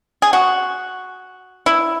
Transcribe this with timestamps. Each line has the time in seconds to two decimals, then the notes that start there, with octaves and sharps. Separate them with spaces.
0.22 G#4
0.33 F#4
1.66 E4